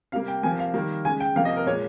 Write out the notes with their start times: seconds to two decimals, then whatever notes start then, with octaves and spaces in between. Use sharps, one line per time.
0.12 C3 G3 A#3 F5
0.28 G5
0.43 C3 F3 A#3 G#5
0.59 F5
0.74 D#3 G3 A#3
1.05 C#3 G#3 G#5
1.20 G5
1.35 C3 F3 A#3 F5
1.45 D#5
1.56 A#4
1.66 A#2 G#3 C#5